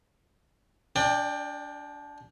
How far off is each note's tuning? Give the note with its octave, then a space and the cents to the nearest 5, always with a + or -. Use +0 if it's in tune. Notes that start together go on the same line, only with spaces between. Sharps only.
D4 -20 D5 +20 G5 +20